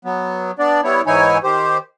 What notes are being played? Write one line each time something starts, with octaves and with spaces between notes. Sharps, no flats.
F#3 B3
B3 D4 D5
G3 B3 E4 C#5
G#2 E3 D#4 E4 C#5 G#5
D#3 G4 C5